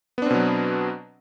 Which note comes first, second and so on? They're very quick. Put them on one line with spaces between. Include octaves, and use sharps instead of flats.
B3 D4 C4 B2 F#3